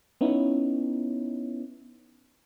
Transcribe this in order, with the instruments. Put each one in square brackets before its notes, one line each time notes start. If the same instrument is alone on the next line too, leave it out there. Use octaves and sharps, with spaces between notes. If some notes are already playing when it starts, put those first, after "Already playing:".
[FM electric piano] B3 C#4 D#4 E4